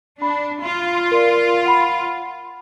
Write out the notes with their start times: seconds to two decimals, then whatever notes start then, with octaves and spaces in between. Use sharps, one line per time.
0.22 D4 B5
0.61 F4
1.12 A#4 D5
1.65 F#5 B5